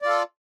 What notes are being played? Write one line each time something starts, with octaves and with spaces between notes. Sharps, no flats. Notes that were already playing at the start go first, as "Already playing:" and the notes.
F4 A4 D5